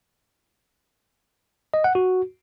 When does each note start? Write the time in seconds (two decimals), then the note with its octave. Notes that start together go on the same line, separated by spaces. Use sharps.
1.74 D#5
1.84 F#5
1.95 F#4